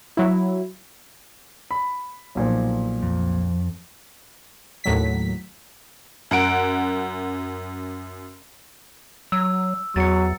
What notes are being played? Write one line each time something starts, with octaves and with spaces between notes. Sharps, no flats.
F#3 E4
B5
B1 A#2 F3
F2
D#2 A2 F#3 B6
F#2 F#5 D7
F#3 E6
E2 F#3 A6 C#7